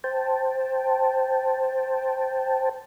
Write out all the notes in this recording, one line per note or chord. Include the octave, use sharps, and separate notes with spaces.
C5 G5 A5